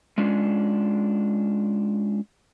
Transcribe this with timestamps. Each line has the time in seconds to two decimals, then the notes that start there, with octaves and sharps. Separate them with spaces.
0.18 G#3 C#4 D4 F4